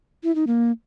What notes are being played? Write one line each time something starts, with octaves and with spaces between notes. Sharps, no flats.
E4
D#4
A#3